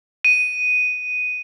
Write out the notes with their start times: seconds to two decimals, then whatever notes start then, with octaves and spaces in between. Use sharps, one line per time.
0.25 D#7